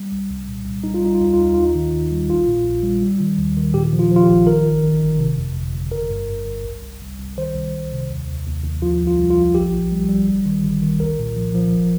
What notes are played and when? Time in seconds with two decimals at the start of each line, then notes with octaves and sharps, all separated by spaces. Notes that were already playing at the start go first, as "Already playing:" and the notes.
Already playing: G3
0.12 C2
0.30 C2
0.48 A#2
0.66 C2
0.84 G3 D#4
0.94 F4
1.02 G3 D#4
1.15 F4
1.20 D#2 D#4
1.34 F4
1.39 D#2
1.44 D#4
1.54 D#2 F4
1.64 D#4
1.75 D#3
1.93 D#2
2.11 G3
2.29 A#1 F4
2.47 A#2
2.65 A#1
2.83 G3
3.02 G3
3.20 D#3
3.38 D#2
3.57 D#3
3.74 A#2 G4
3.93 F3
3.99 F4
4.11 F3
4.16 F4
4.23 G4
4.28 A#1
4.47 D#3 A#4
4.66 G1
4.84 D#3
5.01 G1
5.19 C3
5.38 F2
5.56 G1
5.74 G1
5.92 G1 A#4
6.10 G2
6.29 G2
6.46 G1
6.64 C2
6.83 C2
7.01 C2
7.19 C2
7.38 D#3 C5
7.55 C2
7.74 C2
7.92 C3
8.10 D#2
8.28 D#2
8.46 D#2
8.64 D#2
8.82 F3 F4
9.01 C2
9.07 F4
9.19 C2
9.30 F4
9.38 F3
9.54 A#1 G4
9.73 A#1
9.92 G3
10.09 G3
10.28 G1
10.46 D#3
10.63 G1
10.82 D#3
11.00 C2 A#4
11.19 A#2
11.37 F3
11.55 F3
11.73 G1